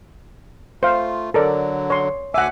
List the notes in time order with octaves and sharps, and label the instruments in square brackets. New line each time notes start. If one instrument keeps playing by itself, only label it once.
[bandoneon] A3 F4 [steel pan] C5 F5
[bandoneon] D3 F#3 [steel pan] A4 A#4 D5
[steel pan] C#5 C6
[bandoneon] D2 G#5 D6 [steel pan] E5 F#5